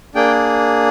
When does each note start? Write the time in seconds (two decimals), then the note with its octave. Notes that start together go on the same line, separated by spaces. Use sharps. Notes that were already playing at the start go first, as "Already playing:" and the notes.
0.15 A#3 D4 G#4 G5